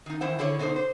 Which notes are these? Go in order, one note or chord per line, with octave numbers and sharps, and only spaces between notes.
D#3 D#4
D#3 E3 E4 C5 F#5
D3 E4 G#4 A4 C#5
B2 D3 D#4 B4 C5
C5